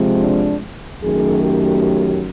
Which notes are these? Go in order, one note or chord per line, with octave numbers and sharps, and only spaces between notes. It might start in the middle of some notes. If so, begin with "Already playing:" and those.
Already playing: C3 F3 G#3
D4
F#2 D#3 F#3 A3 G#4
G4